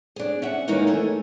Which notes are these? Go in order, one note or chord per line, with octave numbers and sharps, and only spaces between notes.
D4 G#4
C#4 E5 F#5
D#3 E3 G#3 A#3 C#4 D#4
A3 E4 G#4